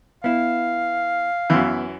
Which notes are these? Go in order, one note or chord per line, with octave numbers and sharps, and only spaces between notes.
B3 E4 F5
F#2 E3 B3